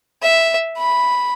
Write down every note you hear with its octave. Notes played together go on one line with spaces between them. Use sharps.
E5
B5